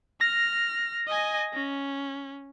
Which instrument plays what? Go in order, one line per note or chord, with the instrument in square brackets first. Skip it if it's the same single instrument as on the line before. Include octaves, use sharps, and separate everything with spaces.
[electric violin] F6 [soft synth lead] A#6
[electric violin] D#5 G#5
C#4